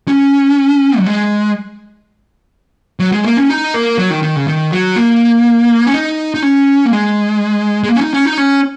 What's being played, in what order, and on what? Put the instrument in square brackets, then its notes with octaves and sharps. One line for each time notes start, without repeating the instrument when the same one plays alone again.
[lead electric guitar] C#4
F#3
G#3
F#3
G#3
A#3
C#4
D#4
A#3
F#3
D#3
D#3
C#3
D#3
F#3
A#3
C#4
D#4
D#4
C#4
A#3
G#3
G#3
A#3
C#4
D#4
C#4
D#4
C#4